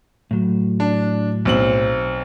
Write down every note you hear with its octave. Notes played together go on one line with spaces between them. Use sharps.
A2 F#3
D4
B1 C4 F#7